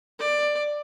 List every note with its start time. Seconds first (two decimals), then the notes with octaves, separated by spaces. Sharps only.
0.19 D5